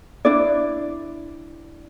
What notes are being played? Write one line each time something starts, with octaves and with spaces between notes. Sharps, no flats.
D4 E4 D5